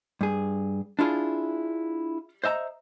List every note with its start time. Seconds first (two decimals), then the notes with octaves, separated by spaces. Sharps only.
0.21 G2 G#4
0.99 D4 E4 F4 G#4
2.44 C5 D#5 E5 A5 A#5